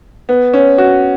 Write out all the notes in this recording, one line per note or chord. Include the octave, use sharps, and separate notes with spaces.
B3
C#4
F#4